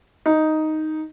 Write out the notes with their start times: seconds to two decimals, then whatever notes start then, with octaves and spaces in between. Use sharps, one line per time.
0.26 D#4